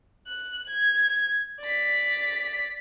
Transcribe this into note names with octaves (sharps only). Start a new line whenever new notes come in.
F#6
G#6
D5 B6